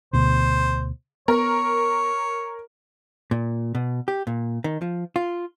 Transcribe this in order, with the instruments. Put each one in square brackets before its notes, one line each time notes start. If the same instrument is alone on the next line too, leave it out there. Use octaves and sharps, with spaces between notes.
[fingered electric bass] D2 B2 [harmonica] C5
[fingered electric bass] B3 [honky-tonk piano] A#4 [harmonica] C#5
[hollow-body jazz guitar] A#2
B2
G4
A#2
D#3
F3
F4